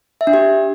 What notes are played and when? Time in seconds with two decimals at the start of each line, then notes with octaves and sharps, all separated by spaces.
0.21 E5
0.27 D4
0.33 G4